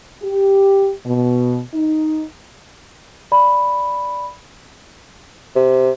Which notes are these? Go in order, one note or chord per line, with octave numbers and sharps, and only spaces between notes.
G4
B2
D#4
D5 B5
C3